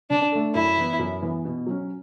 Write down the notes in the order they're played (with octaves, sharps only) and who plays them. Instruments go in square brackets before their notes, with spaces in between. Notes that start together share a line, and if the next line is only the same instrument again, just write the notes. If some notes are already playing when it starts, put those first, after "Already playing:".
[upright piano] D3 [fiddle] D4
[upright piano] A3 D4 A4
[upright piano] F#2 [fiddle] E4
[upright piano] E3 B3
F#2
E3 B3
B2
F#3 C#4